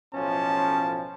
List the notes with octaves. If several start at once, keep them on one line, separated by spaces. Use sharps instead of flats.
B1 A2 F3 C#4 A5